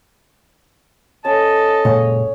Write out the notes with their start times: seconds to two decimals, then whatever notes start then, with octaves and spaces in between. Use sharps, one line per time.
1.25 C#4 A4 D#5 A5
1.85 F#1 A#2 G#3 C#5